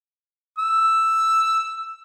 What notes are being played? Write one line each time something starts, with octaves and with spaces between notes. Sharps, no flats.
E6